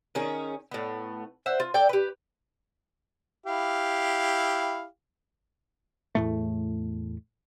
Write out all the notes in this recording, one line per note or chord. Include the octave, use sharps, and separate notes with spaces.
D#3 C#4 G#4
A2 B3
C5 E5 F#5
F4
A4 D5 G5
G4 B4
E4 G4 F5
E2 A2 A3